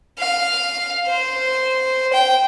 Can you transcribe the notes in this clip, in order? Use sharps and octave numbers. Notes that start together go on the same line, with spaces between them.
F5
C5
G5